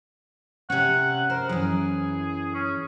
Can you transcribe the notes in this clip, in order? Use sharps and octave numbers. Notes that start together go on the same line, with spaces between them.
C3 C#4 F#5
A#4 C5
F#2 E3 G#4
C#4